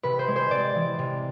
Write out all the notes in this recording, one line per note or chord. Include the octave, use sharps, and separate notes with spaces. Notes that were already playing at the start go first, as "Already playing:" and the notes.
C3 B4
C5
G#3
C5
C3 D5
E3
C3